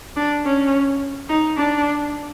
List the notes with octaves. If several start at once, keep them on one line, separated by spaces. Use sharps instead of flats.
D4
C#4
D#4
D4